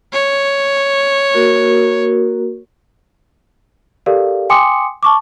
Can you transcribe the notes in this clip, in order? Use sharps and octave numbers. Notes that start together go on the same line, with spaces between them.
C#5
A#3 F#4 A#4
G4 A4 A#4 D5 F5
G5 G#5 C6 D6 D#6 C#7
A5 C#6 D6